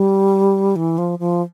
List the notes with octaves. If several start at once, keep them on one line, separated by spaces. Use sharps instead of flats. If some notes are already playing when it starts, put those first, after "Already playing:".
Already playing: G3
E3
F3
F3